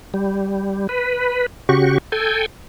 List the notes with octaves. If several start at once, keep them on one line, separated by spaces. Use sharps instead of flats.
G3
B4
C#3 F#4 G4 C#6
A4 G5 G#5